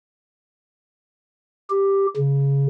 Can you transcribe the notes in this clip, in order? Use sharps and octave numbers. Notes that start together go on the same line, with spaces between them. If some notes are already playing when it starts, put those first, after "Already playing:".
G4
C#3